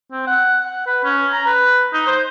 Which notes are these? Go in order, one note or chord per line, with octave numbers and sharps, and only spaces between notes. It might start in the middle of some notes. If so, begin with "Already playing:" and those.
C4
F#5
F#5
B4
C#4
A#5
B4
D#4
C5